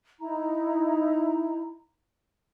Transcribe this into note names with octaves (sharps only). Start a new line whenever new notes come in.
D#4 E4 A#5